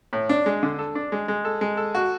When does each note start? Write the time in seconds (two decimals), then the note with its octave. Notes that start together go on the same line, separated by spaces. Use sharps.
0.13 A2
0.29 D4
0.46 G#3
0.63 D3
0.79 A4
0.95 D4
1.12 G#3
1.28 G#3
1.45 A4
1.61 G#3
1.77 A4
1.95 F#4